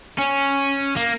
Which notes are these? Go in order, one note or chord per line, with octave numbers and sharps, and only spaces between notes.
C#4
A#3